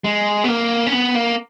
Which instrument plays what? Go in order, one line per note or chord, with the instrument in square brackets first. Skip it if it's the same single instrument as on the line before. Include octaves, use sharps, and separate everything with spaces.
[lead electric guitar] G#3
B3
A#3
C#4
B3
A#3